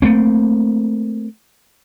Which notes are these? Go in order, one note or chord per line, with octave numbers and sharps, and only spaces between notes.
A3 A#3 C4